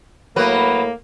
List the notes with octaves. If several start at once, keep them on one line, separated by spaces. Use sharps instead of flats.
A2 F#3 A#3 B3 B4